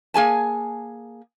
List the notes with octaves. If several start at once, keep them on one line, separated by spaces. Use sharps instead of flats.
A#3 G#4 G#5 A5